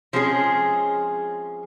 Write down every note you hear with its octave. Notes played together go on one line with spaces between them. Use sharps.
F3 G#3 C4 C#4 G#4